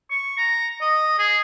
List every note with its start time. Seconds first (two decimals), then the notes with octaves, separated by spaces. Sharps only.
0.11 C#6
0.38 A#5
0.81 D#5
1.19 G#4